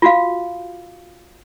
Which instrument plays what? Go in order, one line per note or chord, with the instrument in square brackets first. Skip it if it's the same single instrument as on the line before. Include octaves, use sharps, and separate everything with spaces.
[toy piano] F4 F#4 F5